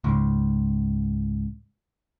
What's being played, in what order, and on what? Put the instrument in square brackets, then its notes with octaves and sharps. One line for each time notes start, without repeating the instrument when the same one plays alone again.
[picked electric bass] C#2 G#2